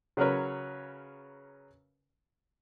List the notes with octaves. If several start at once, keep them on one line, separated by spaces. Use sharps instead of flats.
C#3 F#3 C#4 A#4 B4 C#5